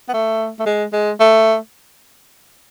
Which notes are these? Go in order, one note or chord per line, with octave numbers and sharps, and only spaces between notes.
B3
A3
A3
G#3
G#3
A3